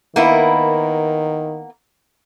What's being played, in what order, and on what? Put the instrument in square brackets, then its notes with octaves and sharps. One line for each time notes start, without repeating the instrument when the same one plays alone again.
[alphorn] D#3 [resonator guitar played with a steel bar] A#3 B3 E4